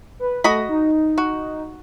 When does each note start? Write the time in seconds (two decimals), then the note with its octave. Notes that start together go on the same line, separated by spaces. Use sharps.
0.19 B4
0.44 A3 F#4 D#5 B5
0.69 D#4
1.18 F#4